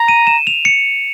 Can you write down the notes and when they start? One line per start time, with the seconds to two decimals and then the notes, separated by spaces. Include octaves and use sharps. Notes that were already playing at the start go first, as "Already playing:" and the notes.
Already playing: A#5
0.08 D#7
0.27 E7
0.47 F7
0.65 C#7